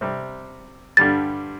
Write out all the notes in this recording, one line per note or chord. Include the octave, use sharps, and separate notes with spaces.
C3 G3 C4
G2 D3 G3 A6